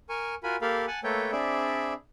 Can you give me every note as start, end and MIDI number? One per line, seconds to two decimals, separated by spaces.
0.09 0.35 70
0.09 0.35 80
0.09 0.35 85
0.43 0.56 65
0.43 0.56 66
0.43 0.56 70
0.43 0.56 80
0.43 0.56 83
0.61 0.85 58
0.61 0.85 67
0.61 0.85 69
0.61 0.85 70
0.61 0.85 77
0.61 0.85 83
0.87 1.00 78
0.87 1.00 80
0.87 1.00 81
1.04 1.31 57
1.04 1.31 58
1.04 1.31 69
1.04 1.31 71
1.04 1.31 73
1.04 1.31 79
1.32 1.93 60
1.32 1.93 62
1.32 1.93 68
1.32 1.93 74
1.32 1.93 76
1.32 1.93 83